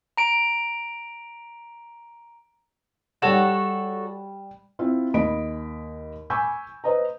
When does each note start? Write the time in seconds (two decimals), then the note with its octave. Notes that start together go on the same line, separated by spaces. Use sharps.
0.17 A#5 D7
3.22 G3 F#4 A4 C#5 E7
4.79 C4 E4 F4
5.14 D#2 D#5 B5 D7
6.30 G#5 B5 C#6 D6 E6 G6
6.84 B4 C5 D#5 A#5